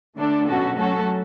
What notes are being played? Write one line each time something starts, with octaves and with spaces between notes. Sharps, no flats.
D3 A3 D4 A4
B2 F#3 C#4 F#4 A4
F#3 A3 C#4 F#4 A4